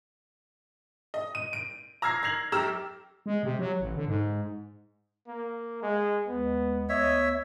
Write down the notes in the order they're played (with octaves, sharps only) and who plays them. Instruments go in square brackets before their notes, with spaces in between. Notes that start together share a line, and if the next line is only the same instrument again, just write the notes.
[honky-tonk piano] D#5
D#7
D7
A#5 E6 F6 G#6 A#6 C7
G#6 A#6 C7 F7 F#7
F#2 G4 A#5 E6 F6 E7
[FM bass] G#3
C3
F#3
A1
D3
G#2
[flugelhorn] A#3
G#3
[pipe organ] D#2 G#3 [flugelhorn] B3
[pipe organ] D2 B3 E6 [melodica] C#5 E5 [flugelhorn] D#5